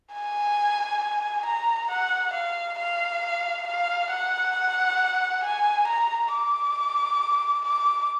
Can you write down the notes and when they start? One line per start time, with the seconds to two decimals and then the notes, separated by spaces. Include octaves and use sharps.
0.13 G#5
1.46 A#5
1.90 F#5
2.33 F5
2.79 F5
3.67 F5
4.10 F#5
5.43 G#5
5.87 A#5
6.33 D6
7.65 D6